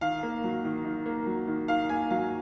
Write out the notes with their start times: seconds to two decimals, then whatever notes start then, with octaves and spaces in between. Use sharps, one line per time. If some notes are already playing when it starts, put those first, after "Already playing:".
0.01 D#3 F5
0.23 A#3
0.44 F#3
0.65 D#3
0.85 D#3
1.06 A#3
1.26 F#3
1.48 D#3
1.68 D#3 F5
1.89 A#3 G#5
2.11 F#3 F5